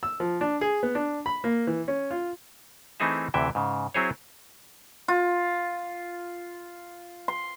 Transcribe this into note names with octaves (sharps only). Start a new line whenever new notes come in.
E6
F3
D4
G#4
B3
D4
B5
A#3
E3
C#4
F4
E3 A3 C4 D#4 G#4 E5
D2 C3 E3 E5 G5
G#2 C#3
F#3 C4 E4 G#4 C5 C#5
F4
C6